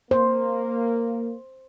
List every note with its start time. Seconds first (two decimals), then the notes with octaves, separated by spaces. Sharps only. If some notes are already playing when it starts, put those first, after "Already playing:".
0.11 A#3 C5